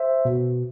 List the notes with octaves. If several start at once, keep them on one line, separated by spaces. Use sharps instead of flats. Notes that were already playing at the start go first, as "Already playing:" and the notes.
Already playing: C5 E5
B2